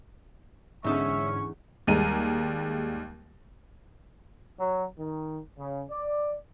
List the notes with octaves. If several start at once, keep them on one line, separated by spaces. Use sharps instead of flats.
E2 G#2 D3 C#4 D#4 E5 A5 C#6
D#2 G3 G#3 A#5 D#7
F#3
D#3
C#3
D5